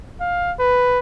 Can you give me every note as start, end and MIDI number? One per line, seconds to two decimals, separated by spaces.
0.20 0.53 77
0.59 0.99 71